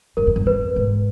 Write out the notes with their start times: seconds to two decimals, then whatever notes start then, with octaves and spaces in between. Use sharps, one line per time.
0.17 F#2 A#4
0.27 F2
0.36 F#2
0.46 F2 B4
0.76 G#2